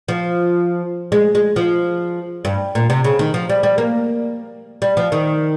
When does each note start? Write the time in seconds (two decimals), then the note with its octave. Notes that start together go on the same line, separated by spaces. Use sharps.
0.08 F3
1.12 G#3
1.35 G#3
1.56 F3
2.45 G2
2.75 A#2
2.90 C3
3.04 C#3
3.19 D#3
3.34 F3
3.49 G3
3.63 G3
3.78 A#3
4.82 G3
4.97 F3
5.12 D#3